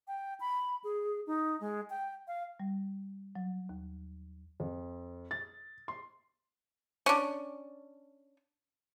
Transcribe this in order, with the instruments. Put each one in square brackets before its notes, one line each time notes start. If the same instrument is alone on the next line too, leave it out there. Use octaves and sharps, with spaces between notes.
[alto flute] G5
B5
G#4
D#4
G#3
G5
F5
[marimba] G3
F#3
D#2
[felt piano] F2
A6
C6
[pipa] C#4 D4